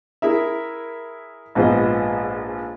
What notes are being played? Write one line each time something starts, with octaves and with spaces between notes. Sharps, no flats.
E4 G#4 A#4 E5
A#1 G#2 F3 B3 D#5